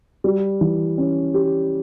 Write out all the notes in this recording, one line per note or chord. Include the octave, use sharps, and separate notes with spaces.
G3
E3
C#4
G4